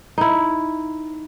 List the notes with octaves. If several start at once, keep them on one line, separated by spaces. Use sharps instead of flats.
D#4 E4